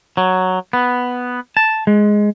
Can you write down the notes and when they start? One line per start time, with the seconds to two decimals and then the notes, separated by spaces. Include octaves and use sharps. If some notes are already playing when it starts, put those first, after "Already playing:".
0.17 F#3
0.73 B3
1.57 A5
1.87 G#3